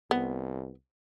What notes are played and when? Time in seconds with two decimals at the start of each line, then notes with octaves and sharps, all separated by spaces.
0.11 C2 B3